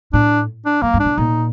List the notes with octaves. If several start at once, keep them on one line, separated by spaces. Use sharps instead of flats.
A2 D4
D4
F#2 A#3
G2
D4
A2
A#2 D#4